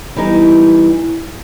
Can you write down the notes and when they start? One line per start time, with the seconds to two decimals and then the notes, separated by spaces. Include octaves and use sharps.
0.16 E3 G3 B3 D#4